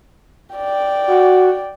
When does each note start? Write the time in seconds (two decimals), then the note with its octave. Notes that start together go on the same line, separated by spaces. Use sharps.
0.56 D5 G5
1.08 F#4